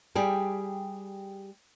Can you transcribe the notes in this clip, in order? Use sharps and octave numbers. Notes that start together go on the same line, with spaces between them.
G3 G4 G#4